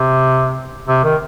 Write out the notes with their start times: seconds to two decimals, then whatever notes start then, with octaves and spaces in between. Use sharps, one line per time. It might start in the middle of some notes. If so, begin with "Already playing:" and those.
Already playing: C3
0.88 C3
1.04 D#3